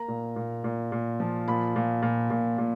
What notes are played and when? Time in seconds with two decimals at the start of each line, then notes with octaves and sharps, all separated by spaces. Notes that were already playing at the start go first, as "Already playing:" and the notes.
Already playing: A#3 A#5
0.08 A#2
0.36 A#2
0.64 A#2
0.92 A#2
1.20 F3
1.48 A#2 B5
1.76 A#2
2.02 A#2
2.30 A#2
2.58 A#2